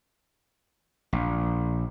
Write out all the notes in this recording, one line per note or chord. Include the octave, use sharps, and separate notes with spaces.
A#1